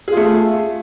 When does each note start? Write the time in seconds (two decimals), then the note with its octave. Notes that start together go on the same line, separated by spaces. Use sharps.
0.08 G#4
0.12 F4
0.17 A3